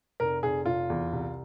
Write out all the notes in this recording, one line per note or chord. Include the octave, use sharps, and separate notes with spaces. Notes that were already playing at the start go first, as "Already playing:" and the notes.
F1 A#4
F1 G#4
F1 F4
E2
C2